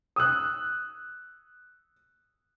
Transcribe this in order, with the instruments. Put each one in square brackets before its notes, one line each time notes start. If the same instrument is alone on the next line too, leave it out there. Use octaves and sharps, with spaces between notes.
[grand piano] D#6 E6 F#6